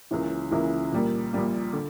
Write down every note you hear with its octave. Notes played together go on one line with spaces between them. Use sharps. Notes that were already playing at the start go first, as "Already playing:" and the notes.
C#2 C#3 E3 A#3 E4
C#2 C#3 E3 A#3 E4
A#1 A#2 G3 A#3
A#1 A#2 G3 A#3
D3